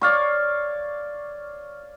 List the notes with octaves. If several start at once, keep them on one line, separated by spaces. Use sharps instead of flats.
C#5 D5 F5 C#6